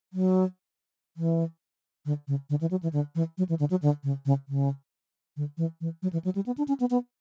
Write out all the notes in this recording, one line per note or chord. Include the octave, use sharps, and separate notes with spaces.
F#3
E3
D3
C#3
D3
E3
F#3
E3
D3
E3
F#3
E3
D3
F#3
D3
C#3
C#3
C#3
D3
E3
E3
F#3
E3
F#3
G3
B3
D4
C#4
B3
B3